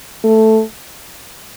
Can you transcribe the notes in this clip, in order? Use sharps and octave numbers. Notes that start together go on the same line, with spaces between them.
A3